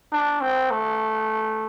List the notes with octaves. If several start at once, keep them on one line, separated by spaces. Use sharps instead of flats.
D4
C4
A3